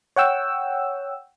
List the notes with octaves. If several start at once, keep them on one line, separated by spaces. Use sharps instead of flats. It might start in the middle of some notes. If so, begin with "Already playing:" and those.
C#5 F#5 G5 E6